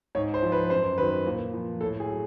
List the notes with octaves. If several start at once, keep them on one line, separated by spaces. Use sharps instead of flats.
G#2 C#5
C5
F3
B4
F#2 C5
D#3 F#3 B4
A#2
F3
A2 A4
G#4
F#3